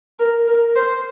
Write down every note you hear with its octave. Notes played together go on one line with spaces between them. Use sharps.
A#4
A#4
C5